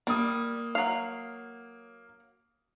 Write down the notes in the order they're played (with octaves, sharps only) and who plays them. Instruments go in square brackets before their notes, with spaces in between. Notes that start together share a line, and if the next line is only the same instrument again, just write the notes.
[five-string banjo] G3 [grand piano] A#3 D#6
[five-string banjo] F#3 F5